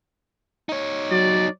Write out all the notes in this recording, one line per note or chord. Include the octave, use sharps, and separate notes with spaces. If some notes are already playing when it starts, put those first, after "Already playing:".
D#4 C#5
F#3 D5